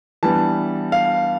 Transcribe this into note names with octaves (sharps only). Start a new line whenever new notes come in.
E3 G3 B3 D4 A5
F5